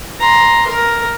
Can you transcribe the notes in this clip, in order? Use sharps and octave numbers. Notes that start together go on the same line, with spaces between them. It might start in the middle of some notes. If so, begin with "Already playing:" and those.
A#5 C6
A#4